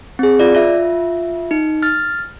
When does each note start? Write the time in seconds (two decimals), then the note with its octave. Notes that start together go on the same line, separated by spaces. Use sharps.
0.19 C4 G#4
0.39 F4 D5
0.55 F4 E5
1.51 D#4
1.83 F6 A6